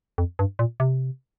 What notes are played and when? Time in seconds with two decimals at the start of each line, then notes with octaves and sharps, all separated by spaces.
0.18 F2
0.39 G2
0.59 A#2
0.80 C3